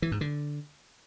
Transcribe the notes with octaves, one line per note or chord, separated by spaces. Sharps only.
E3
G#2
D3